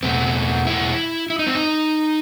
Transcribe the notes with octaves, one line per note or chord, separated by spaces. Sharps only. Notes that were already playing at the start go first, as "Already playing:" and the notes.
E2 B2 A3 C4
E4
E4
D#4
C4
D#4